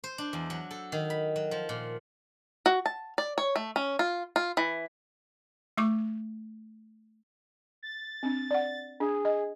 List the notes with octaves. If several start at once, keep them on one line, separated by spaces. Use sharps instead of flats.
C5
D4
E2
F#3
A4
D#3
B5
F#3
F3
A#2
F#4
A5
D5
C#5
A3
C#4
F4
F4
E3
A3 C#6 D6
A6
C4 D4
D5 F#5
D4 G#4
D#5